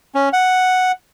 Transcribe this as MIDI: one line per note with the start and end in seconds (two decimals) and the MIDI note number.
0.15 0.29 61
0.33 0.92 78